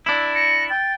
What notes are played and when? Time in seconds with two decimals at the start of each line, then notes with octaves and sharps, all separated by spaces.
0.06 D4 E4 E6
0.35 A#6 C#7
0.69 G5 A6